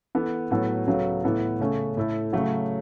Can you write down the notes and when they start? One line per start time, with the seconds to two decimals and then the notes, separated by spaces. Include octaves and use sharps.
0.15 E3 B3 A4
0.51 A2 F#3 B3 F#4 A4
0.87 C#2 C#3 F#3 B3 A4
1.24 A2 E3 B3 E4 A4
1.60 C#3 A3 C#4 A4
1.97 A2 A3 E4 A4
2.33 C#3 F#3 A3 F#4